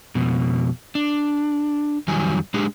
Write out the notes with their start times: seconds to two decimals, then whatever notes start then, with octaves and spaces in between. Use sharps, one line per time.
0.15 F2 B2
0.95 D4
2.08 F2 D#3 F#3 G3 G#5
2.54 G#3 D4 G4 G#4